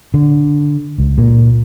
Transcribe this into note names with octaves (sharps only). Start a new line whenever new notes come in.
D3
C#2
A#2